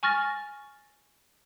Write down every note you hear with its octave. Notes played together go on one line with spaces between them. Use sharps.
G#5 C#6 F6 A6 A#6